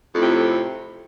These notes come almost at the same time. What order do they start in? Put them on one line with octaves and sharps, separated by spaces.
F2 A2 C3